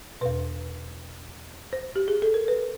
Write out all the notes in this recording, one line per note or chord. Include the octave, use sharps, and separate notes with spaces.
E2 B2 B4
C5
G4
G#4
A4
A#4
B4